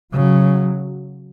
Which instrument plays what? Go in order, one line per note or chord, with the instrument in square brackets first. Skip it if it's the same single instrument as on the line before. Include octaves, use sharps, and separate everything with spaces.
[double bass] C#3 [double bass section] F#3